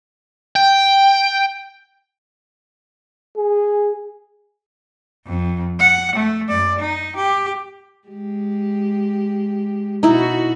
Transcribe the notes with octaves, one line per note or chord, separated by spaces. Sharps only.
G5
G#4
F2
F#5
A3
F#2 D5
D#4
G4
G#3 G4
B2 D#4 E4 F#4